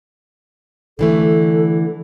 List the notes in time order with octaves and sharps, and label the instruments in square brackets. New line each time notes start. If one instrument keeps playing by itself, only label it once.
[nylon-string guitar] D3 E3 A3 [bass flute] A4